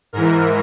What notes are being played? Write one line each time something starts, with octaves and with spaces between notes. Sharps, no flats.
G#2 E3 A#4